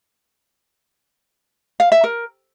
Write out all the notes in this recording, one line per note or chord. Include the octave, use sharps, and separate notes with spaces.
F5
E5
A#4